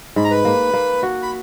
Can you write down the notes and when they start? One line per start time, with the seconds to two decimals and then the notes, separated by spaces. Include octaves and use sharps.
0.16 G#2 B5
0.24 A#5
0.31 B4 B5
0.45 A#3
0.74 A#3
1.03 F#4
1.23 B5